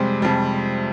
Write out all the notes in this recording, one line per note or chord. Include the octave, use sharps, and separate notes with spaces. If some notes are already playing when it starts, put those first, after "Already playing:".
Already playing: F2 C3 G3 G#3 C4
F2 C3 G3